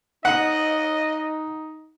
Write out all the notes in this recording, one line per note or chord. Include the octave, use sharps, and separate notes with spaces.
D#4 D#5 F#5